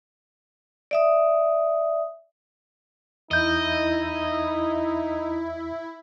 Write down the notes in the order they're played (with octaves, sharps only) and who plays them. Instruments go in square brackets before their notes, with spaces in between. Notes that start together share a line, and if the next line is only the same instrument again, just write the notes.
[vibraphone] D5 E5 D#6
[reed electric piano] E2 G6 [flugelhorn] D#4 [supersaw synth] E4 [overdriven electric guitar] D#5